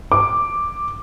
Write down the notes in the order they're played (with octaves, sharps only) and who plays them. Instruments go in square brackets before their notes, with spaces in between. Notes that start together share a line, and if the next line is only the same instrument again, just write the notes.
[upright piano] D6